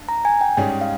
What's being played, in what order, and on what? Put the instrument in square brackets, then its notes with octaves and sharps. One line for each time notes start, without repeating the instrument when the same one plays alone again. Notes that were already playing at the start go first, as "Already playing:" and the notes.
Already playing: [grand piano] G2
[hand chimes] A#5
G#5
G5
[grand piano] G#2 G3 C#4 G#4 [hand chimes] G5
[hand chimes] F5